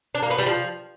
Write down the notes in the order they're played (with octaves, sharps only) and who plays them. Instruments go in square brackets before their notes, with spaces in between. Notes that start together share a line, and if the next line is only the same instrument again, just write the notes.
[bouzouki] D4
A#3
B3
G3
F3